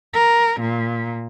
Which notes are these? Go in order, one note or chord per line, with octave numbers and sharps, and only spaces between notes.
A#4
A#2